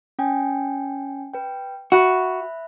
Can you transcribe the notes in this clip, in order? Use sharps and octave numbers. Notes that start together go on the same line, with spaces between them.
C#4 G5 G#5
B4 G5
F#4 E5 B5 F#6